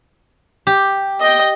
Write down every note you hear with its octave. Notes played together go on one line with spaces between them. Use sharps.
G4
D#5 G5